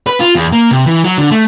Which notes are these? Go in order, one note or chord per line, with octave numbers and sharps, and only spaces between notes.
B4
F4
E2
A#3
C3
E3
F#3
D3
A3